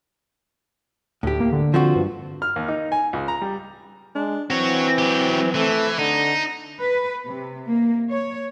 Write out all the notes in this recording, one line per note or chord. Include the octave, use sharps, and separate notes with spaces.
D2 A2 G4
A#3
D3
F3 C4 F#4
G2
F6
D#2
D#4
G#5
C#2
A#5
G3
G#3 D4
E3 C4 F#4 C#5
F#3 G4
E3 A3
D3 D#4
B4
C3
A#3
C#5